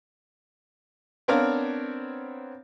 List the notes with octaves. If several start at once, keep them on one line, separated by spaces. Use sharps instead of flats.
B3 C4 D4 A#4 C#5 F5